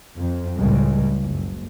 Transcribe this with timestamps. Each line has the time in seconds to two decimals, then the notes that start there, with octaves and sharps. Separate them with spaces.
0.19 F2
0.58 C#2 A2 C#3 G3 G#3
1.20 F#1